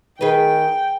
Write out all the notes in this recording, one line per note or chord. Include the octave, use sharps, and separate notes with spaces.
D#3 G#4 B4 G5